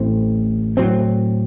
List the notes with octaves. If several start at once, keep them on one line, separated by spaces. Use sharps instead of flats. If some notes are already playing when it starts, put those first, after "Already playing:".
Already playing: A1 A2 A3 C4
A2 F#3 C4